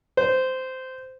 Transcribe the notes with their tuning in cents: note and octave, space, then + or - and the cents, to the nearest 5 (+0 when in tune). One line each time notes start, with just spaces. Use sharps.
C5 -15